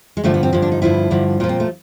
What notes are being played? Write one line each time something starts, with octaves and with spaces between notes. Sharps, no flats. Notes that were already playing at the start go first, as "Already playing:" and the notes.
G#3
G2 D3 F3 A3
B3
C4
G2 D3 F3
D4
D#4
G2 D3 F3 E4
G2 D3 F3
A#2 F3 F4
C4
A3